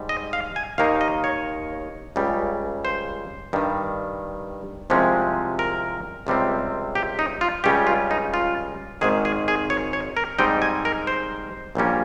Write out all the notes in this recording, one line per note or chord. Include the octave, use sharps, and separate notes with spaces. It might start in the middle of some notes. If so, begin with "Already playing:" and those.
Already playing: G#2 G3
D#5
F5
G#5
D#2 D#3 A#3 D#4 F5
D#5
C#5
C#2 C#3 G3
C5
G2 D#3 G3
C2 C3 F3 G#3 C#4
A#4
C#2 C3 G3 C4
G4
D#4
F4
C#2 C#3 G3 C#4 G4
F4
D#4
F4
G#1 G#2 D#3 G#4
G#4
G#4
C#5
C#5
A#4
G#2 G3 C4 D#4 G5
G#5
A#4
C5
A#1 A#2 G3 A#3 C#4